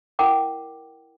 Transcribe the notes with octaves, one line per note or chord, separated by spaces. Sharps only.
E4 A#4 F#5 G5 D6